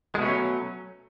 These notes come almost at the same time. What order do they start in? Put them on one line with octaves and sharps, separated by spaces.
G#3 B2 A3 C#4 F#3